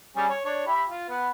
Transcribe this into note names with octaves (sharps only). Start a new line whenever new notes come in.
G3 C#4 G#4
C#5
D4 C#5
E4 G4 B5
F4
B3 B4